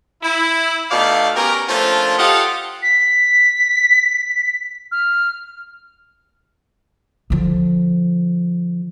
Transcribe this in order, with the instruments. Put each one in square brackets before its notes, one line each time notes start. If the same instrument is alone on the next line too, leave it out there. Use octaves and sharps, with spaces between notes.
[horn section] E4
B2 A3 D#4 D5 F5
B3 C#4 G4 A#4
F3 A3 A#3 C#4 D4 F4
F4 G4 A4 D#5 F5 F#5
[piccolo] B6
F6
[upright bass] D3 F3